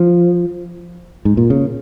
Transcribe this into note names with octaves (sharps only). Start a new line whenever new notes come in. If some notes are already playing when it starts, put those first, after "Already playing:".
Already playing: F3
G#2
A#2
C#3